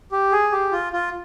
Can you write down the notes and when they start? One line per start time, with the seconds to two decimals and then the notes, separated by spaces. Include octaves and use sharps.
0.12 G4
0.32 G#4
0.52 G4
0.72 F4
0.93 F4